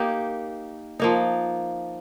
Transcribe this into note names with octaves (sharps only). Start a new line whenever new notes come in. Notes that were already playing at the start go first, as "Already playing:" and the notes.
Already playing: A#3 D#4 G4
F3 A#3 D#4